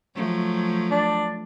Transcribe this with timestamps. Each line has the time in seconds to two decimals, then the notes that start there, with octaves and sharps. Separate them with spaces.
0.14 F3 F#3 A3
0.91 D4